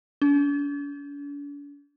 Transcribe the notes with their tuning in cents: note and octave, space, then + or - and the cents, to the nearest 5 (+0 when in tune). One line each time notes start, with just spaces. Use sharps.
D4 -45